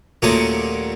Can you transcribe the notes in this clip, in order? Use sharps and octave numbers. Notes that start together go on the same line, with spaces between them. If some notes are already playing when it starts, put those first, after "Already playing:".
D#2 A#2 F#3 A3 C#4 D#6